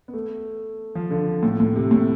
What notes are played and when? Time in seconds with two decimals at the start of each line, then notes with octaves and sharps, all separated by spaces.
0.08 B3
0.14 A3
0.95 F3
1.11 D3
1.43 A2
1.60 A2
1.76 C3
1.91 A2